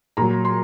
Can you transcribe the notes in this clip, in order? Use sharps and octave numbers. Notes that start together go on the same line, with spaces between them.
A#2 F#3 A#5
C6